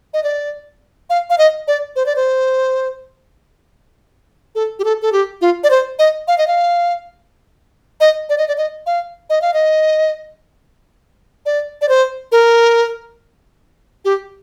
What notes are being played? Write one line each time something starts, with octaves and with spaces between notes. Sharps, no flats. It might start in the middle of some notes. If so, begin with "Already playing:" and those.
D#5
D5
F5
F5
D#5
D5
C5
D5
C5
A4
G4
A4
A4
G4
F4
D5
C5
D#5
F5
D#5
F5
D#5
D5
D#5
D5
D#5
F5
D#5
F5
D#5
D5
D5
C5
A#4
G4